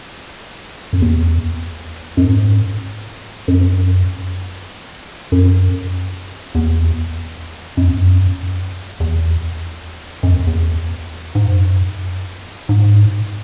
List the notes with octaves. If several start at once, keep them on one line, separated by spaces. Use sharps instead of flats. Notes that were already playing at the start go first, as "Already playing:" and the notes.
F#2
E2
F#2
G#2
F#2
F#2
E2
F#2
E2
F#2
E2
F#2
E2
E2
G#2
F#2
G#2